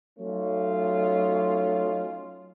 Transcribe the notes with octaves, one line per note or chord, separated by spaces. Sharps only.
F#3 A3 C#4 D#4 F4